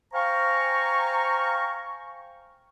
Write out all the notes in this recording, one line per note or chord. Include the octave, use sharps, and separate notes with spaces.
C5 F5 G5 G#5 A#5 C#6